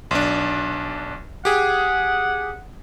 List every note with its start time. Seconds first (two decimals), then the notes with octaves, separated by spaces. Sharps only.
0.11 B1 D4
1.45 G4 G#4 F#5